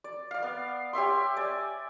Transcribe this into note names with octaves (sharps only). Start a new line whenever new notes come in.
D5
D5 F5
B3
G4 C#5 E5 C6
D5 G#5